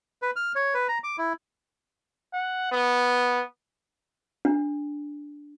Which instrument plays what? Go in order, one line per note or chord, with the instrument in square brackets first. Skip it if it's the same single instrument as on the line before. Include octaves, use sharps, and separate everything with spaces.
[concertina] B4
F6
C#5
B4
A#5
D6
E4
[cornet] F#5
B3
[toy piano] D4